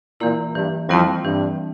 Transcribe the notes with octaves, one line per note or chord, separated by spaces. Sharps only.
A#2 E3 A#3 E4
G2 E3
F2 G3 C4 E4
G2 E3